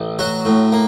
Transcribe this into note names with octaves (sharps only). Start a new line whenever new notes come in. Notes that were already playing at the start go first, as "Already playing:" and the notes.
Already playing: A1
F#3 F#4
A2
A#3